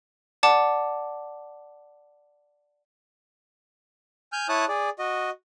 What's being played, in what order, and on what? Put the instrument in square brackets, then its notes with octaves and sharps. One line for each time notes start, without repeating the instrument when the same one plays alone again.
[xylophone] D5 F#5 A5 D6
[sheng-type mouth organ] G#5 F6 G6
E4 C#5 A5 D#6 F#6
G#4 D5
F#4 D#5